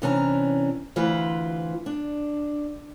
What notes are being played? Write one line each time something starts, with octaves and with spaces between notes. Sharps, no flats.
C3 E3 C#4 D4 F5 A#5
D2 E3 F4 B4 C5
D4